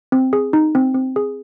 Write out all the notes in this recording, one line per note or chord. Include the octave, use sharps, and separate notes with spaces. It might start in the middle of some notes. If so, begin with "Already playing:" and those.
C4
G#4
D#4
C4
C4
G#4